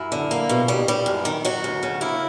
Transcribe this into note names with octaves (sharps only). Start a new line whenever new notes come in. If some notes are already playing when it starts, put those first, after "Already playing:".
Already playing: F#2 E4
D3
A#3
B2
G3
G3
F#2
D#3
F#3 F#4
D2
C#3
A#3 E4